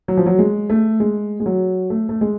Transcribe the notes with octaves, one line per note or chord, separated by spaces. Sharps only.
F#3
F3
F#3
G#3
A3
G#3
G#3
F#3
A3
A3
G#3